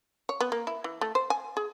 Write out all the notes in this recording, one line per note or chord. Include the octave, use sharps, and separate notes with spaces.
C#5
B3
A#3
E4
E3
A3
C5
G#5
G#4